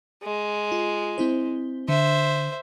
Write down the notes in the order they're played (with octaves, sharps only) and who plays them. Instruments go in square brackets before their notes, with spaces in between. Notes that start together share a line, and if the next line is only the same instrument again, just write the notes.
[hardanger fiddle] G#3
[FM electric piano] F4
C4 E4 C5
[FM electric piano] D3 [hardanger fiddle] C5 E5